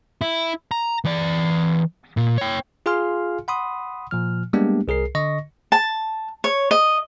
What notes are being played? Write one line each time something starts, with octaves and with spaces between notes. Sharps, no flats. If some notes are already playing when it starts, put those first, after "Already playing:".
E4
A#5
E3 D5
A#2
C#5 G5
F4 G#4 F5 G#5 C6 F6
F#5 B5 C6 D#6
A#2 F3 F6
G3 G#3 A#3 B3 D4 G4
C2 G#4 A#4 C7
D3 D#5 C#6 A#6
A5
C#5
D#5